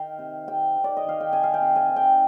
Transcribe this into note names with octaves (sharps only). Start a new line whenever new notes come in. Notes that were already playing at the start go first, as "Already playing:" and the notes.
Already playing: D#3 F5 G5
C3
C3 G5
D#3
D5
D#5
D#3 F5
G5
C3 G#5
F5
G5
C3
G#5
D#3
G5